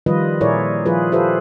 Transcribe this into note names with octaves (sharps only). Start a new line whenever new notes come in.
D#3 F3 G3 F4 B4 D#5
A#2 E4 G#4 A#4 C#5 D5
F3 E4 F4 G#4 B4
F4 G4 A4 B4 C5 E5